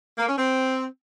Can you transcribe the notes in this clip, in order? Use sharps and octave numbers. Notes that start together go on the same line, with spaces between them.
A#3
C#4
C4